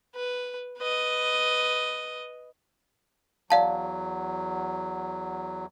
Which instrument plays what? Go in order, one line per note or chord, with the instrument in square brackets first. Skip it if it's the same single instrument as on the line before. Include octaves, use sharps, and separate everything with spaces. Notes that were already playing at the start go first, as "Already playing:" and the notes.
[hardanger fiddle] B4
B4 D#5
[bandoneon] E2 F#3 [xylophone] D5 F5 A5